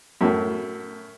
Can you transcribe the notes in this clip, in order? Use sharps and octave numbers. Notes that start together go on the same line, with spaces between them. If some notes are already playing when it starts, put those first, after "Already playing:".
F#2 A2